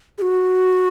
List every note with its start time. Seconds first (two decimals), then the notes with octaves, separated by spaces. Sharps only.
0.18 G#4
0.22 F#4